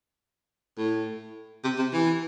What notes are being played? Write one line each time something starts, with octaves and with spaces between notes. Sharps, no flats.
A2
C3
C3
E3